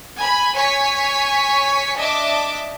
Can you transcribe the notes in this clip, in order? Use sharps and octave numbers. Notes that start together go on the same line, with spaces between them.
G#5 B5
C#5 G#5 C#6 B6
D4 D#5 E5 D6